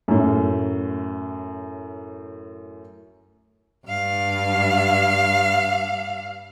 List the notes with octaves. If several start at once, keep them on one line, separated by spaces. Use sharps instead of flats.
F#2 A2
G2 F5